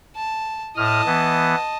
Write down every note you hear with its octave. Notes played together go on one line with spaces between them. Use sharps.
A5
A2 D#5 A5 D#6 F6
E3 B3